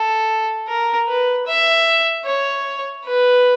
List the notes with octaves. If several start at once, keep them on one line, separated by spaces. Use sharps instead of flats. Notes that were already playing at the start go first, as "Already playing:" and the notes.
Already playing: A4
A#4
B4
E5
C#5
B4